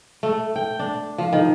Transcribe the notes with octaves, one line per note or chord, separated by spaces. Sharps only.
A3
G5
D4
F3
D#3